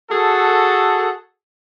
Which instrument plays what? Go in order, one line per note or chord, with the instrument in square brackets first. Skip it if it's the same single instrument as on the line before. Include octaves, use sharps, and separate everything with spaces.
[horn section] F#4 G#4 A4